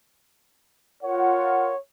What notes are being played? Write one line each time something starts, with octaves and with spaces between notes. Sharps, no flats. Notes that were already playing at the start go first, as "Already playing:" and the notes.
F4 A#4 C#5 F#5